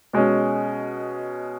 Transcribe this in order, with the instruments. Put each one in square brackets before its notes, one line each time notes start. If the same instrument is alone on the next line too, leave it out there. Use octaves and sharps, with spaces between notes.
[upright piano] B2 G#3 C#4